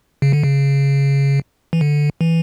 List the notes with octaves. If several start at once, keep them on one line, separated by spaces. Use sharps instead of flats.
C#3
D3
C#3
E3
D3
E3